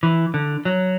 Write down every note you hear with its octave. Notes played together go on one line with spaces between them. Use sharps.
E3
D3
F#3